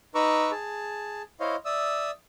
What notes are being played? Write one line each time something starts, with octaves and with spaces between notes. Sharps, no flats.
D#4 B4 A#5 C#6 D6 E6
G#4 A5
E4 C5 C#5 D#5 F5
D5 E5 D#6 E6